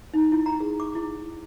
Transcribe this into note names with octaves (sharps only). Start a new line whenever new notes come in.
D#4
E4
A#5
G#4
D6
E4